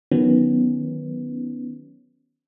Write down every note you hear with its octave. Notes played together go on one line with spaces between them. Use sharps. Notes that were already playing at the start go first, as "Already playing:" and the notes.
D#3 F#3 B3 C#4